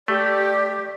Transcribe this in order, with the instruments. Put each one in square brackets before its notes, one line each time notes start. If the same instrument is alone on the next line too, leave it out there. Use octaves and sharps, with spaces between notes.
[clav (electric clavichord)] A3 [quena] G4 [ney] D5